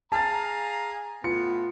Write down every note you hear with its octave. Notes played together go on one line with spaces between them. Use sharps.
G#4 F5 A5 A#5 A6
A2 B3 F4 C#7